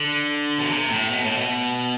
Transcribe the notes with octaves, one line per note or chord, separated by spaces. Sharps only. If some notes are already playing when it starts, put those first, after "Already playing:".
Already playing: D3
B2
C3
A2
B2
A2
B2